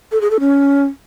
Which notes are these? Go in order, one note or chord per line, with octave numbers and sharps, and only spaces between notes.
A4
G#4
A4
C#4